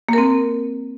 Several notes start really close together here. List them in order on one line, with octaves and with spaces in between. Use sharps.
A#3 A#4 C4